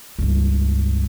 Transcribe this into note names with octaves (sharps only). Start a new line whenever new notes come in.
C#2 G2